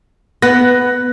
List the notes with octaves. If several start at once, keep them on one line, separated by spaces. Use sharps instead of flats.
B3 F#6 A#6